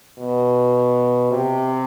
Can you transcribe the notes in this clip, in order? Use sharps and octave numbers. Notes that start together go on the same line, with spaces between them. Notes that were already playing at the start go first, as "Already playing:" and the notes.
B2
C3